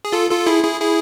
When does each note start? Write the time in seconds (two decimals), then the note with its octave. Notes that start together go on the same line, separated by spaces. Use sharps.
0.05 G#4
0.12 F4 A4
0.31 F4 A4
0.46 E4 G#4
0.64 E4 G#4
0.80 E4 G#4